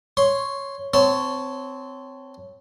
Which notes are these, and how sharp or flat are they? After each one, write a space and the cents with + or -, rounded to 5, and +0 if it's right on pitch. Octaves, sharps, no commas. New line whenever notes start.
C#5 +0 C6 +0
C4 -20 C#5 +0 A5 +0